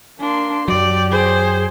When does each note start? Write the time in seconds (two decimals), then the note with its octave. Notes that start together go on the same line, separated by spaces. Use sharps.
0.20 A#3 D4 C6
0.68 F#2 F#3 G4 D5
1.11 G#4 C5